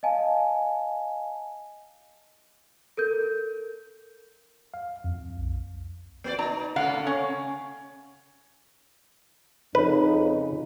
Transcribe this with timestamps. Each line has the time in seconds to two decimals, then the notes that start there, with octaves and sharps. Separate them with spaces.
0.03 D#5 F5 G#5 A5
2.97 A4 A#4 G6
4.74 F5
5.04 F2
5.37 B1
6.24 A#3 F#4 D5
6.39 D#4 A#5
6.76 C#3 A3 A#3 F5 F#5
7.07 C#4
9.75 F2 C#3 D#4 B4